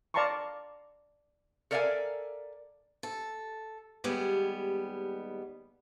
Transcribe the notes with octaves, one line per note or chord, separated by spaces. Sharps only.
D5 F5 A5 A#5 C6 C#6
A4 A#4 D5 E5 F5 G#5
A4
D#2 G3 G#3 B3